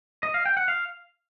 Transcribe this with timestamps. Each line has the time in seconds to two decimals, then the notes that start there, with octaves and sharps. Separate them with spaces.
0.23 D#5
0.34 F5
0.45 G5
0.57 F#5
0.68 F5